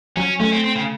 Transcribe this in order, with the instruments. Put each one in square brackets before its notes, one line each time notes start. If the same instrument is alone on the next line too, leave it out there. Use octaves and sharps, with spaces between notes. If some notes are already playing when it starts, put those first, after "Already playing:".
[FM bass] F#3 [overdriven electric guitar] C#4
[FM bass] A3 [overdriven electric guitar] C#4
[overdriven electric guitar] C4
C4
C#3